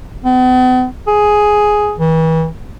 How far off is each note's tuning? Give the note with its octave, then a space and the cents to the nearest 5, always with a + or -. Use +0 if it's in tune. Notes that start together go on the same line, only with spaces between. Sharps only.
B3 +45
G#4 +5
E3 -35